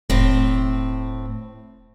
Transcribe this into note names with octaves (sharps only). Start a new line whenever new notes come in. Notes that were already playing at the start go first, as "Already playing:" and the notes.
E1 A2 C4